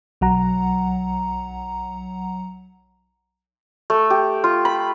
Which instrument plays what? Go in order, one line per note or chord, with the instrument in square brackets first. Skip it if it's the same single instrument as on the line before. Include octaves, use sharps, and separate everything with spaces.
[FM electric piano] B1 F#3 F#5 A#5
[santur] A3
G4
F4
B5